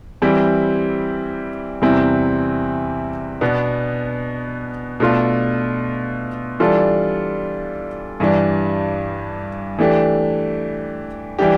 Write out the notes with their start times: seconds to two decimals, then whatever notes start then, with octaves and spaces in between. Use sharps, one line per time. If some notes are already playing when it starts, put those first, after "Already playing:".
0.22 E3 G3 C4 E4
1.82 E2 C3 G3 C4 E4
3.41 B2 B3 D4
5.00 B2 A3 D4 F4 A4
6.60 E3 G3 D4 F4 A4
8.20 G2 E3 G3 D4
9.78 E3 A3 D4 G4
11.39 E3 G3 D4 G4